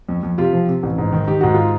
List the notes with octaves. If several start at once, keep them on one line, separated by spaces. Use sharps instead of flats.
F2
F2
C3 F4 G4
F3
C3
A1
G#2
D#3
D#3 G4
G#2 F#4
F4